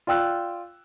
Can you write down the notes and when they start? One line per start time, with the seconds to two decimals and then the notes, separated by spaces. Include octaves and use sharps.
0.07 F4 D5 G5 E6 F#6